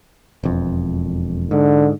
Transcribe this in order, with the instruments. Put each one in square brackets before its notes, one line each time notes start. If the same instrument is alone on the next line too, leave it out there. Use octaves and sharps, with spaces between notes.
[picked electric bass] E1 F2
[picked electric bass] G#2 [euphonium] D3